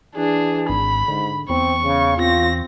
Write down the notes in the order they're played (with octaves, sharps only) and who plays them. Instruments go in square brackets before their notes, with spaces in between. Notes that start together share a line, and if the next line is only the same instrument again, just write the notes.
[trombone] E3 [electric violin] D4 G#4
[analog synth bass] G#1 [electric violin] B5
[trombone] G#2 [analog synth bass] D3
[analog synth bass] E2 [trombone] C4 [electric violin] C#6
[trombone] C#3
[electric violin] C4 A#6 [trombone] F4